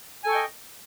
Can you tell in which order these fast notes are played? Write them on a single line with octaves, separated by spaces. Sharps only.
G#5 A4 C#6 G5 D#5